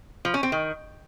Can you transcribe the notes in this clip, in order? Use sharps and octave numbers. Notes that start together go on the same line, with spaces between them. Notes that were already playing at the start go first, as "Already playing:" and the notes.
F3
C#4
C4
D#3